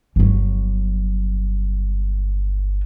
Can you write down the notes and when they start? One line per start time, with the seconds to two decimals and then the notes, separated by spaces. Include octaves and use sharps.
0.16 G1 F#3